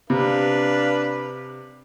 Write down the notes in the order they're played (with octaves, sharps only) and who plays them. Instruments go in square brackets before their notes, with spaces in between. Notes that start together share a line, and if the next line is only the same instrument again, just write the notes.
[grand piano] C3 [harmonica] D4 B4 F5